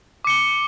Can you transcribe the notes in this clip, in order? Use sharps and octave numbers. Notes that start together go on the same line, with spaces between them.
D6 C#7 G7